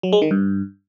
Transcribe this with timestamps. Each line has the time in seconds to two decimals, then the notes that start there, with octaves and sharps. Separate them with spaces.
0.03 F#3
0.13 G#3
0.22 D#3
0.31 G2